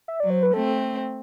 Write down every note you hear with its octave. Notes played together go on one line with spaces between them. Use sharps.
E5
F#3 D5
C5
B4
A3 C4 A4